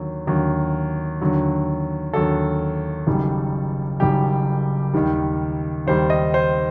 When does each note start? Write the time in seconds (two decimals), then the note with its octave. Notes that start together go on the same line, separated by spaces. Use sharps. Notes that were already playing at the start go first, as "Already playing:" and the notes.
Already playing: D#2 D3 F#3
0.27 D#2 D3 F#3
1.21 D#2 D3 F#3
2.13 D#2 D3 F#3 A4
3.07 F#1 F#2 D#3 G3
4.00 F#1 F#2 D#3 G3 G4
4.94 D#2 D#3 G3
5.87 D#2 D#3 G3 C5
6.10 D#5
6.34 C5